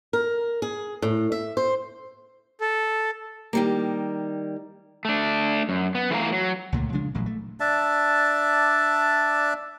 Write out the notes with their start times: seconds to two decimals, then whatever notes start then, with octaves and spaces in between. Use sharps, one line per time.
0.13 A#4
0.62 G#4
1.02 A2
1.32 E5
1.57 C5
2.61 A4
3.53 D#3 G3 A#3
5.05 A3 D4
5.69 F#2
5.95 B3
6.10 E3 A3 F4 A#4 F5 A#5
6.32 F#3
6.72 C#2 A#2 D3 A3
6.93 C#3 F3 G#3 D4
7.15 A1 A#2 F#3 G#3
7.26 A3
7.60 D4 D5 E5 A5